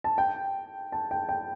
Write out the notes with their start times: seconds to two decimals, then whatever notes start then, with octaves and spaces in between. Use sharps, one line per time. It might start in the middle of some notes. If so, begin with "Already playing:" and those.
0.04 A5
0.18 G5
0.92 A5
1.11 G5
1.29 G5